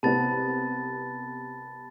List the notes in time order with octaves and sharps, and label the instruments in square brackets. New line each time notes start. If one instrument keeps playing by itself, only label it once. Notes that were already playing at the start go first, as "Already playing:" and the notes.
[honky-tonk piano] C2 B3 C4 [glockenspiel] A5 B5 A6